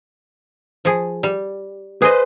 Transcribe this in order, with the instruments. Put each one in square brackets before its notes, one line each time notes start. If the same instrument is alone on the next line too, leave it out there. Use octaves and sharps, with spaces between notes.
[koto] F3 G#4
G3
[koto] G#4 D#5 [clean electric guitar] B4 C5